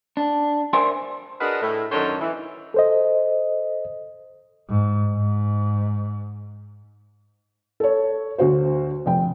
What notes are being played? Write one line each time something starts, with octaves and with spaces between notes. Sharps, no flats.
D4
A#4 C5 D5 E5 G#5 C6
D4 F#4 G#4 A#4 B4 D#5
A2
F#2 D3 D#3 A4 C5 C#5
E3
A4 C5 D#5
G#2
G#2
A4 C#5
D2 F#4 C5
F1 G5